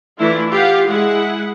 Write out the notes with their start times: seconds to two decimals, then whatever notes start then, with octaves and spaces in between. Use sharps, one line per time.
0.19 E3 A3 D4 E4 F4
0.51 F4 G4 F5 F#5
0.87 G#3 E4 G#4 F#5